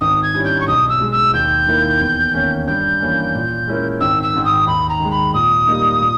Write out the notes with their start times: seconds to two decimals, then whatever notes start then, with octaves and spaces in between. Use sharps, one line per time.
0.01 G#1 D#6
0.23 G#6
0.34 G2 G3 C#4 E4
0.45 G6
0.60 C#6
0.67 B1 D#6
0.89 E6
1.00 B2 G#3
1.12 E6
1.34 D#2 G6
1.67 D#3 A#3 E4 A#4
2.01 E2
2.34 D#3 A#3 C#4
2.67 G2 G6
3.00 E3 A#3 C#4
3.34 A#2
3.67 G#3 C#4 E4 A#4
4.00 G#1 E6
4.23 E6
4.34 G#2 D#3
4.45 D#6
4.67 D#2 B5
4.89 A#5
5.00 D#3 G#3
5.12 B5
5.33 A#2 D#6
5.67 G3 A#3 D#4
6.01 A#2